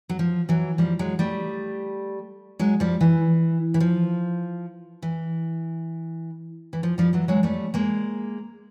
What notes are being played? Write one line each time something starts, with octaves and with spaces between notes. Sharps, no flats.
F#3
F3
E3 F#3
F3 G3
F#3 G#3
G3 A3
F#3 G#3
F3 G3
E3
E3
F3
E3
E3
F3
F3 G3
E3 F#3
F#3 G#3
G3 A3
G#3 A#3